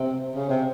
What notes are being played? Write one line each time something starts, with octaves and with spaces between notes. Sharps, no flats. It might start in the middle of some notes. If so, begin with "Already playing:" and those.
Already playing: C3
C#3
C3